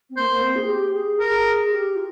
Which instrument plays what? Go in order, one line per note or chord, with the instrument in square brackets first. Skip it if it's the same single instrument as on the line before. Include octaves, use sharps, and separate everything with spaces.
[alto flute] C4
[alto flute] A#3 [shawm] C5
[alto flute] A#3
C4
G#4
G4
G#4
[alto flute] G#4 [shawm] A#4
[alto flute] G4
F4